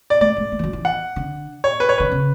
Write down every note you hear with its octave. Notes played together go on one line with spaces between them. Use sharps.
D5
A3 D5
G#3
A3
E3
F#3
E3
F#5
D3
C#5
B4
C#5
D3 B4
C#3